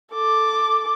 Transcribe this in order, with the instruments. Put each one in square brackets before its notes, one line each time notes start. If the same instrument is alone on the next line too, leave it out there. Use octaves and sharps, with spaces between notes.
[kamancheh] A4 D6